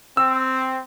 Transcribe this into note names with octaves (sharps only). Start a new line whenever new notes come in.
C4 E6